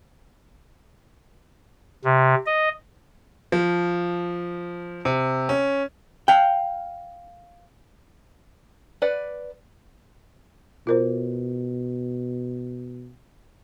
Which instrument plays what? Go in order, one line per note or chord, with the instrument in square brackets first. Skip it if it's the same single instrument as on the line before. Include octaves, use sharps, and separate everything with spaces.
[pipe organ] C3
D#5
[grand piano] F3
C3
C#4
[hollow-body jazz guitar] F5 G5
[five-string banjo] B4 D5 F#5
[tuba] B2 [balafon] F4 A#4 C5